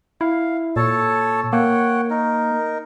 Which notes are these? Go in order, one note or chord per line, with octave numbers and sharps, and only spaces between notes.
E4 F5
A#2 A4 C#5 A5
A#3 C#5 F#5 G5
D#4 A#4